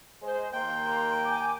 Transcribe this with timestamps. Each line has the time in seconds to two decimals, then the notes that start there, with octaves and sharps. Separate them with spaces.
0.22 G#3 C5
0.53 D#2 A#3 G5 C6
1.26 G#5 D6 G6